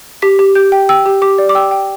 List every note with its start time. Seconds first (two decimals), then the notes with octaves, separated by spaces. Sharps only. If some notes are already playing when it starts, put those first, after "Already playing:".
0.22 G4 B6
0.39 G4
0.55 G4 G6
0.72 G5
0.89 G5 E6
1.06 G4
1.22 G4 D6
1.38 D5
1.49 D6
1.55 G5 E6
1.71 G5